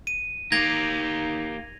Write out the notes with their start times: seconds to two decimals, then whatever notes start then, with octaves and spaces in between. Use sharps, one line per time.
0.07 D#7
0.52 A#3 D#4 G4 G#6 A#6 F7